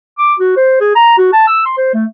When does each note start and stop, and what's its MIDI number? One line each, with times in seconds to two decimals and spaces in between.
0.18 0.34 86
0.39 0.53 66
0.56 0.80 72
0.81 0.90 68
0.95 1.15 82
1.17 1.29 66
1.33 1.46 81
1.47 1.62 88
1.66 1.77 84
1.77 1.93 72
1.94 2.06 57